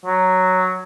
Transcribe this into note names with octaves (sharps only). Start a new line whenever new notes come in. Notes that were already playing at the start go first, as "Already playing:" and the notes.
F#3